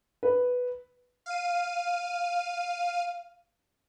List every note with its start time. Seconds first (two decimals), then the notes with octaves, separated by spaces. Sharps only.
0.23 B4
1.26 F5 D#7